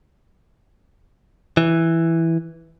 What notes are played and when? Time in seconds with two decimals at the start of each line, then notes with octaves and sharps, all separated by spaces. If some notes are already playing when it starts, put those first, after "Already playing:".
1.57 E3